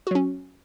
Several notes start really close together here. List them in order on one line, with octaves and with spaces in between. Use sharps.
F#4 F#3 C#4